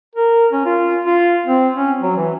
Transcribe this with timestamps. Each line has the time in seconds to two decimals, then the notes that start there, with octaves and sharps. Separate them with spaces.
0.15 A#4
0.52 C#4
0.66 F4
1.05 F4
1.47 C4
1.76 C#4
2.02 F#3
2.17 E3